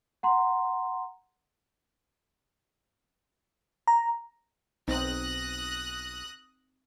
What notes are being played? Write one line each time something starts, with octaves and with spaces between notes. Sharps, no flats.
F#5 A#5 C6
A#5
B1 C4 D#4 D#6 F#6 A#6